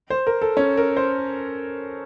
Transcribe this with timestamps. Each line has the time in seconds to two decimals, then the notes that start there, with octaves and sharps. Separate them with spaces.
0.10 C5
0.27 A#4
0.42 A4
0.57 C#4
0.77 A#4
0.97 C5